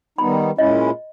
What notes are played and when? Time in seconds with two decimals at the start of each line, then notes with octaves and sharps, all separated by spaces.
0.18 D#3 G3 B3 D#4 B5
0.58 A#2 G#3 C#4 E4 D#5